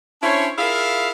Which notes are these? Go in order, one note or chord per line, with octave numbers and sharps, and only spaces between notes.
C#4 D4 E4 C5 C#5
E4 F4 G#4 A#4 E5 F5